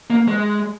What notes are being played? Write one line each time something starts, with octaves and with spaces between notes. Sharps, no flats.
A#3
G#3